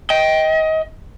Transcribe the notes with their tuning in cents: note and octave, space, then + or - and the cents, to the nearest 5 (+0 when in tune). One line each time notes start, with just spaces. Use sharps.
D#5 +25 G5 +0